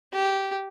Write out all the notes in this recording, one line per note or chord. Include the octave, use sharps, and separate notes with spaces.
G4